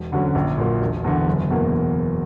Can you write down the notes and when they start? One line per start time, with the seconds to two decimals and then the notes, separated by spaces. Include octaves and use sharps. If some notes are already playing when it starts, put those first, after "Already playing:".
Already playing: E1
0.12 D2 D3 F#3 C#4
0.35 A#1
0.58 A#2 F#3 A#3
0.81 E1
1.04 E2 D3
1.28 F#1
1.51 E2 B2 A#3